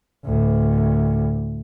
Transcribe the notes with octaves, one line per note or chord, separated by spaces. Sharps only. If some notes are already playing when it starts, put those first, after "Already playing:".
D2 A2